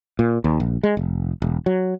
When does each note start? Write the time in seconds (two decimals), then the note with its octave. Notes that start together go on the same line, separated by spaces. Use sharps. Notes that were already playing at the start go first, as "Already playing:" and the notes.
0.19 A#2
0.44 D#2
0.60 A#1
0.83 G#3
0.97 F1
1.42 E1
1.66 F#3